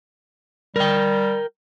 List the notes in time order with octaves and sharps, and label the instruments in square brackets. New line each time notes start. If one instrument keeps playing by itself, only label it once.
[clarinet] G3 [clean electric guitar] A#4 G5